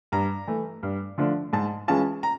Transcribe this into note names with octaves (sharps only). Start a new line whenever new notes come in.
G2 A#5
E3 A3
G2
D3 F3 A3 D4
G#2 A5
E3 G#3 C#4 F4 A5
A#5